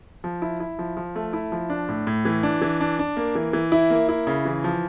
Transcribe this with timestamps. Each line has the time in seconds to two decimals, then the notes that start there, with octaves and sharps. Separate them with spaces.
0.24 F3
0.42 E4
0.60 E4
0.79 F3
0.97 F3
1.15 A3
1.33 E4
1.52 F3
1.70 D4
1.89 A2
2.07 A2
2.25 E3
2.43 D4
2.62 E3
2.81 D4
2.99 D4
3.17 A#3
3.35 E3
3.53 E3
3.72 E4
3.90 A#3
4.09 E4
4.27 C#3
4.45 E3
4.64 F3